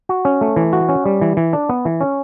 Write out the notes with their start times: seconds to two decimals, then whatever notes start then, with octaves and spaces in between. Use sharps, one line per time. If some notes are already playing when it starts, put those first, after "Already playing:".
0.09 F#4
0.25 C#4
0.41 A3
0.56 E3
0.73 F#4
0.89 C#4
1.05 G3
1.21 E3
1.37 E3
1.53 D4
1.69 B3
1.85 E3
2.01 C#4